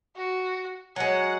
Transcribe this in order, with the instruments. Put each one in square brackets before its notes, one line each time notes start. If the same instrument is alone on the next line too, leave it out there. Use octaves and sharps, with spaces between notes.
[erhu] F#4
[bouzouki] F#3 G#3 [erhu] F#5